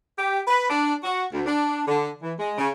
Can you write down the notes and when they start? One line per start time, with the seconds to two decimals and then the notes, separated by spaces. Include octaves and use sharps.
0.19 G4
0.48 B4
0.70 D4
1.04 F#4
1.33 D2
1.46 D4
1.87 D3
2.23 E3
2.39 G#3
2.58 C#3